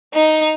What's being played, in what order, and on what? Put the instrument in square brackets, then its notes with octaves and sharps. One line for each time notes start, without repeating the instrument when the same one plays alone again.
[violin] D#4